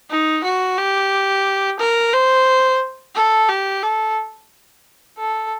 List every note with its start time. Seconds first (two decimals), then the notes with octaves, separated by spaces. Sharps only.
0.10 D#4
0.44 F#4
0.78 G4
1.80 A#4
2.13 C5
3.15 A4
3.49 G4
3.83 A4
5.18 A4